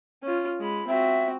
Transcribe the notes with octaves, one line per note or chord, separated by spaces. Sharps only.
C#4 F4
G#3 B5
C4 F#4 E5